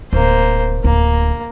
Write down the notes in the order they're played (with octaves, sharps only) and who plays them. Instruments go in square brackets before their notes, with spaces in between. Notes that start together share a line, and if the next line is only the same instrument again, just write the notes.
[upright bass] D1 [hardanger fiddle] A#3 C5
[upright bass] D1 D2 [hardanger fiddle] A#3